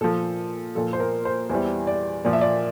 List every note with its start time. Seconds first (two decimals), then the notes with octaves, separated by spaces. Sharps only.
0.01 A#2 F3 A4
0.75 A#2 F3 A4
0.93 C5
1.00 A#4
1.25 C5
1.49 E2 E3 G3 C5
1.87 D5
2.25 A#2 F3 D5
2.33 E5
2.41 D5